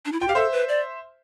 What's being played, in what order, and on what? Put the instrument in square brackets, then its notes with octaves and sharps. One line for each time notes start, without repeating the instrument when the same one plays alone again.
[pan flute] D4
E4
[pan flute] F4 [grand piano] G5
[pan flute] G4 [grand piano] F5
[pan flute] A4 [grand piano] C5 E5
[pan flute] B4
D5